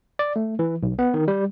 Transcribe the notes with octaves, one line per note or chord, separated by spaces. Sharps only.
D5
A3
E3
B1
B3
D#3
G3